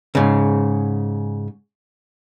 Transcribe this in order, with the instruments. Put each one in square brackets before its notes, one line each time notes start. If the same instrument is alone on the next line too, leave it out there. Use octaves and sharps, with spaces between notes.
[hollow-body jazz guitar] G#2 C#3